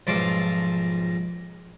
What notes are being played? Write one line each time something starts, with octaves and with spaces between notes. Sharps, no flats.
B1 G#2 F3 A5 D6